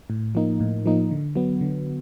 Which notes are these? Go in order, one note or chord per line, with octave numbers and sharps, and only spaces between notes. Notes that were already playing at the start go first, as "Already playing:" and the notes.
A2
F3 A#3 D#4
A2
F3 A#3 D#4
D3
F#3 B3
D3